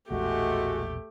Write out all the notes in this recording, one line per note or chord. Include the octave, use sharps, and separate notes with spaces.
E1 A#1 G#3 A3 F#4 G4